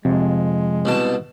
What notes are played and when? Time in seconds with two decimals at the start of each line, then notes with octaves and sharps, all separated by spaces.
0.05 F2 C3 G#3
0.85 C2 B2 A5